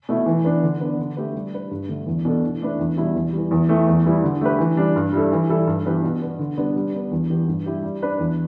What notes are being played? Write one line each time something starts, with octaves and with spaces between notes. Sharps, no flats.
B2 A3 E4
E3
B3 D4 B4
D3
B3 D4 B4
D3
A3 G4 B4
G3
D4 B4
G2
D3 A3
E2
B2 B3 D4 A4
E3
A3 D4 B4
E2
B2 G3 E4
E2
E3 G3
E2
E3 A3
E2
E3 G3 E4
D3
A3 G4 B4
E3
G3 D4
G2
G3 E4 A4
E3
G3 E4 A4
G2
E3 B3 G4 B4
B2
B3 D4
D3
G3 B3 D4 B4
G3
B3 D4
E2
E3 B3 G4
G2
G3 E4 G4
G3
D4 B4
E2